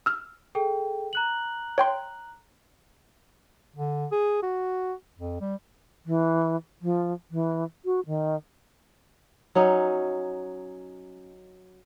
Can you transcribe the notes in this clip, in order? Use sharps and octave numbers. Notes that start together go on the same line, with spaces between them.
E6 F6
G#4 A4 G5
A#5 F#6 F#7
C#5 G5 C6
D3
G#4
F#4
F2
G3
E3
F3
E3
F#4
D#3
F#3 C#4 D#4